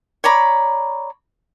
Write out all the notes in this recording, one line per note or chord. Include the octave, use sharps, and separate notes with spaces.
C#5 D5 A#5 B5